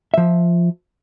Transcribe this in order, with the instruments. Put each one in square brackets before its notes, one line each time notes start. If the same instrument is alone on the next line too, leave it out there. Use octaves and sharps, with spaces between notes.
[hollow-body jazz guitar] F3 E5